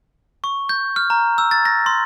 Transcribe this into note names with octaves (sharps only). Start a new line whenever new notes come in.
C#6
G6
F6
A#5
E6
A6
A#6
C6